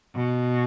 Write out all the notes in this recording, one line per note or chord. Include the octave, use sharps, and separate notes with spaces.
B2